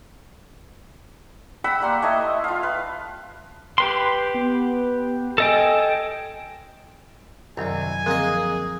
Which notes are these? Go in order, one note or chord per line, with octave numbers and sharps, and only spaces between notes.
F#5 G5 B5 E6
G3 A#3 C6
A3 E4 D#5
F4 F5
B4
G4 B4 G5 C6
B3
A4 D#5 G5 G#5
C2 F#2 D#3 F#3 G#5
D3 F3 A#3 C4 G#4 D#5